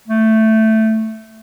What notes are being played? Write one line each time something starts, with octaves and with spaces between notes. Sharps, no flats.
A3